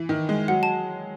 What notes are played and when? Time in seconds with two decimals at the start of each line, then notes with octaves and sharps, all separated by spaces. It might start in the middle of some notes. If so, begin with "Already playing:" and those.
Already playing: E3
0.09 D#3
0.29 G#3
0.48 F#3 F#5
0.63 A5